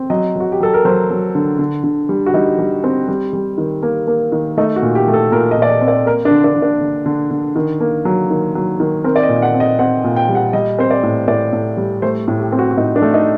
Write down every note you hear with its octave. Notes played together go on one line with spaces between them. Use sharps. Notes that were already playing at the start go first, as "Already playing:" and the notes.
Already playing: C4
F#3 D#5
F#3 F#4
G4
F#3 A4
A#4
F#3 C5
F#3
D3
D3
D3
G3
F#4
G3 D#4
G3
C4
G3
G3
D#3
A#3
A#3
D#3
A3 D#4
F#4
A#2
G4
A3
A4
A#2 A#4
D#5
A#2
D5
D#5
C4
D5
A#3 A#4
D4
D3
D4
D3
D4
D3
D3
D3
D#3
A#3
F#3
D#3
F#3
D#3
C4 A#4
D5
D#5
A#2
F#5
C4
D#5
C4 F#5
A#2
G5
G3
F#5
G3 D#5
C4 C5
D5
A2
A2 D5
A2
G3
A3 C5
A2
G4
C4
F#4
F#4
A2 D#4
D4
A3
D#4